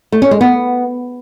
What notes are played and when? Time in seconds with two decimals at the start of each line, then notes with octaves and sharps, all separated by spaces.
0.12 A3
0.22 C#4
0.31 G#3
0.41 B3